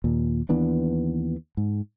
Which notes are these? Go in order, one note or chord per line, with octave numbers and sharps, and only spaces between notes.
D#2 A#2
D#2 E3 B3 D4
G#2